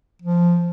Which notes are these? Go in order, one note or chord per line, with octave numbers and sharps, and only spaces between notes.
F3